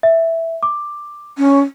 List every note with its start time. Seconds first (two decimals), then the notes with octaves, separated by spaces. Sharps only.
0.03 E5
0.63 D6
1.38 C#4